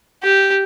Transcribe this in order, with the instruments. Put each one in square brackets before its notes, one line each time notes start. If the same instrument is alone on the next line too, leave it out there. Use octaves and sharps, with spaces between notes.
[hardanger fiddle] G4